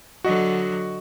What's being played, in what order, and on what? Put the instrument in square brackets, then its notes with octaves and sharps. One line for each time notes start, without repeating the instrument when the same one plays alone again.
[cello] D3 F#3 [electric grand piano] F#4 D#5